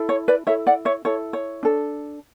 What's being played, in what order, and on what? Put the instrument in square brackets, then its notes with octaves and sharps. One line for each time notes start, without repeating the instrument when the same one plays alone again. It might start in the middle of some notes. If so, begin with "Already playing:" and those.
Already playing: [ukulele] E4 A4
C#5
B4 D5
E4 A4 C#5 E5
D5 F#5
C#5 E5
E4 A4 C#5
C#5
D4 A4